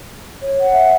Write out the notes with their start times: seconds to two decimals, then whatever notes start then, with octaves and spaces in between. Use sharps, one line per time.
0.42 C#5
0.60 F#5
0.73 E5